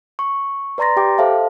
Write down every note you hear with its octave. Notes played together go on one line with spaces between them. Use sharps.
C#6
B4 D5 A#5 C6 A6 A#6
G4 G5 D6
A4 C5 E5 F5 A5